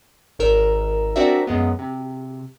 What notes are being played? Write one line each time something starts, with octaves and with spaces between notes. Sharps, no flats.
G#1 D#3 A#4 E6
C4 D4 F#4 A#4 D5 E5
F#2 G#3 B3
C3